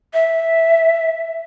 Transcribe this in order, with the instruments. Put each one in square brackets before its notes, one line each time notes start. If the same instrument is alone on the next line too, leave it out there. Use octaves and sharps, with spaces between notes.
[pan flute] E5